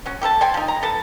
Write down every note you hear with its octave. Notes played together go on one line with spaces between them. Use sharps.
F#3 C#4
G4 A4 A#4 A5
A4 C5 G5 G#5
F3 D#4
A#5
A4 B4 A5